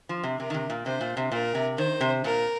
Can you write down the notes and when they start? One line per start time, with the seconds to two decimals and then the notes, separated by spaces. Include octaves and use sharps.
0.09 F3
0.23 C3
0.40 C3 A#4
0.50 D#3
0.54 C3
0.70 A#2
0.86 C3 C5
1.01 A#2
1.17 C3
1.32 A#2 A#4
1.55 C3
1.77 D#3 C5
2.01 C3
2.24 A#2 A#4